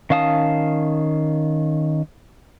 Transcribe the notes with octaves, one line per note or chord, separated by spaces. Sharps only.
D#3 C#4 F5 A5 D#6